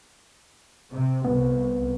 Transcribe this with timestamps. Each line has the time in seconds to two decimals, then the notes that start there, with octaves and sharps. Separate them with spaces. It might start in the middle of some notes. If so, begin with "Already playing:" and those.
0.90 C3
1.25 C2 B3